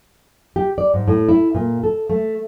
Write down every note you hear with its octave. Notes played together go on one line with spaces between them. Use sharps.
G4
D5
G#2
A2
E4
A#2
A4
A3